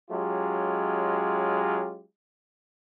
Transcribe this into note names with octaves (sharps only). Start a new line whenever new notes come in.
F#3 G#3 C#4 F4 G4